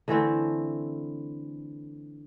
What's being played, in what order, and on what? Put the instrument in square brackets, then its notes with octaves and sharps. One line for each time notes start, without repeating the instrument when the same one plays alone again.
[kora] D3 E3 A3 C4